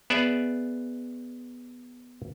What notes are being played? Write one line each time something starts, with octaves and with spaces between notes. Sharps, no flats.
B3 G#4 D5 E5 F#5